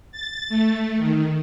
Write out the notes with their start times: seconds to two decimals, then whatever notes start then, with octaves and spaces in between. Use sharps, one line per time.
0.12 A6
0.49 A3
0.96 D#3